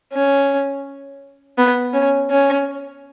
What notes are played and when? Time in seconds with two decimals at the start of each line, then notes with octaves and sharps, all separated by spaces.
0.12 C#4
1.58 B3
1.93 C#4
2.30 C#4